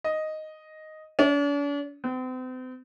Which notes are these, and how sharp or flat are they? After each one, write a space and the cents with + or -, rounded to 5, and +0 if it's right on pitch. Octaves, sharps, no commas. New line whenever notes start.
D#5 +0
D4 -45
C4 -40